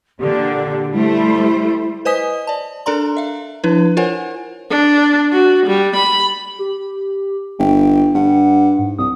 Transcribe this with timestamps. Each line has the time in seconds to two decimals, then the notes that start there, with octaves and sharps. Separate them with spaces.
0.20 A#2 D3 G4
0.92 G3 A3 E4 C5
2.05 B4 C5 D#5 G#5 D#6 B6
2.47 D5 A5
2.86 D4 A4 A#4 D5 A#5 C6
3.17 E5 F5
3.64 F3 D4 E4 B4
3.97 F4 A#4 C5 C#5 F#5 G#5
4.70 D4
5.32 F#4
5.67 G3
5.97 B5
6.59 G4
7.59 G1 G5
8.15 G2 F#5
8.79 G#2
8.99 C2 D#6